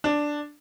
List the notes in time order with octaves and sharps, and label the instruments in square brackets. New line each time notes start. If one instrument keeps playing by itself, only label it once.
[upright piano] D4